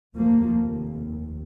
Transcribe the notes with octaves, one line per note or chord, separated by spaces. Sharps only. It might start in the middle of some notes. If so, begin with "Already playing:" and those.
F1 D#2 F3 A#3